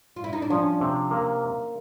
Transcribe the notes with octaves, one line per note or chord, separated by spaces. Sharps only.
F4
E4
D#4
D4
F3 C#4
C3
A#3